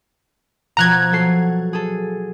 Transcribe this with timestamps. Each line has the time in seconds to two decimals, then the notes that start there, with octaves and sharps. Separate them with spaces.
0.77 B2 F3 A#5 F#6 G#6
1.12 F#3 A4 C7
1.73 G#4 A4